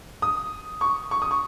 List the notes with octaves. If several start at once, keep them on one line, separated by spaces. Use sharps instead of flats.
D#6
C#6
C#6
D#6
C#6